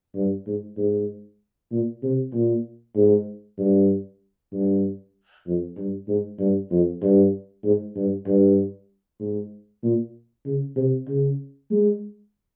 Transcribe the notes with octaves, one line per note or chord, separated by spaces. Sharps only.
G2
G#2
G#2
A#2
C3
A#2
G#2
G2
G2
F2
G2
G#2
G2
F2
G2
G#2
G2
G2
G#2
A#2
C#3
C3
C#3
G#3